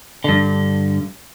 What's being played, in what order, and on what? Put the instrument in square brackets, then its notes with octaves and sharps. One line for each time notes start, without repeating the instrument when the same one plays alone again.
[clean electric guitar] G2 D3